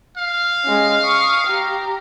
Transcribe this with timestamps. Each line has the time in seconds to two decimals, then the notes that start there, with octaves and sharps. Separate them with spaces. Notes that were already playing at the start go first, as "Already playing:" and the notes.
0.17 F5
0.65 G#3 C#4
1.02 C#6 D#6
1.47 G4 A#5